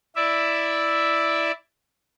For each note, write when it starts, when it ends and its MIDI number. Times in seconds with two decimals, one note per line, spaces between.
0.16 1.52 64
0.16 1.52 74
0.16 1.52 76